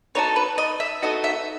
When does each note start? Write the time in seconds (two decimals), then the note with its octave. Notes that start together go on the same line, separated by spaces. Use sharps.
0.15 B3 D#4 F#4 A4 C#5
0.36 B4
0.58 D#5
0.80 E5
1.02 B3 D#4 F#4 A4 D#5
1.24 E5